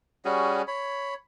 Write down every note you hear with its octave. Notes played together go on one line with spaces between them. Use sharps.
G3 C#4 F#4 G#4
C#5 B5